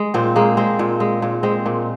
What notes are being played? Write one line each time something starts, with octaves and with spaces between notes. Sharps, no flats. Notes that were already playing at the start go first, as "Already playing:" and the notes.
Already playing: G#3
A#2 C4
G#3 A#3
G#3 C4
A#2
G#3
A#2
G#3 C4
A#2